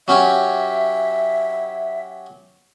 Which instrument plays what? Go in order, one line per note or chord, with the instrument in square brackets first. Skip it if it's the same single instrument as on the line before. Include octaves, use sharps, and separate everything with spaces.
[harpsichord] F#3 C#4 G4 [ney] E5